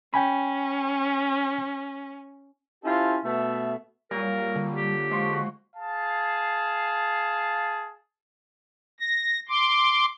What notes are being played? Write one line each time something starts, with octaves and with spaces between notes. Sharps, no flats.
C#4 G5 G#5 B5
C#4 E4 F4 G4 A4 C5
B2 A3 E5
A#2 F#3 G3 A#4
D3
G4
F3 G#3 C6 C#6
F#4
G#4 F5 A5
A#6
C6 D6